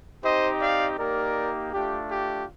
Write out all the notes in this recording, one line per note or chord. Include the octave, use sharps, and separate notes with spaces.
C4 D#4 G4 C5 D#5
D5 F5
A#3 D#4 G4 A#4 D5
A3 D4 F4 G4
G4